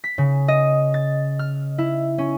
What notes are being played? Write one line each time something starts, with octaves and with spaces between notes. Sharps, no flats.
B6
C#3
D#5
A6
F6
E4
C#4